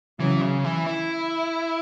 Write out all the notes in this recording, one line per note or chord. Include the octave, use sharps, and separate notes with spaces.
C#3 E3 F#3
C#3
E3
E4